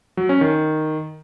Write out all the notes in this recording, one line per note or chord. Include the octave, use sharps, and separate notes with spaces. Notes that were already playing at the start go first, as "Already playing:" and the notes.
F#3
C#4
D#3